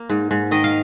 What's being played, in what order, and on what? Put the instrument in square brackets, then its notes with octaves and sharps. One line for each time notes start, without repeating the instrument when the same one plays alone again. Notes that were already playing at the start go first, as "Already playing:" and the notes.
Already playing: [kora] A#3
G#2
G#2
D#3 D#5
F5